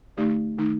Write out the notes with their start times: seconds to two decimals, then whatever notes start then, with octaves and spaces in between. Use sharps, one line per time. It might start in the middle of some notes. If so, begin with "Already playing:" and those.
0.17 D3 A3 D#4 G4 D5
0.58 D#3 A3 D#4